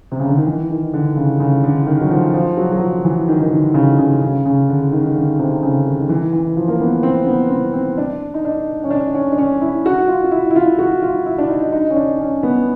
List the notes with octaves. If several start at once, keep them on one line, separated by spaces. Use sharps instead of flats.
C3
C#3
D3
D#3
E3
D#3
D3
C#3
C#3
D3
D#3
F#3
F3
F3
F#3
F#3
F3
E3
D#3
D#3
D3
C#3
C#3
C#3
C#3
D3
D#3
D3
C3
C#3
D#3
E3
E3
F3
A#3
B3
C4
B3
C4
C4
D4
D#4
D4
C#4
D4
C#4
D4
C#4
E4
F#4
F4
F4
E4
E4
F4
F#4
F4
E4
D4
D#4
D#4
C#4
D4
C#4
B3